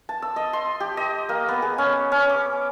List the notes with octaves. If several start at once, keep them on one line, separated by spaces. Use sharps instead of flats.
A5
E6
D#5
C6
G4
D#5
A#3
B3
G#4
C#4
C#4
D6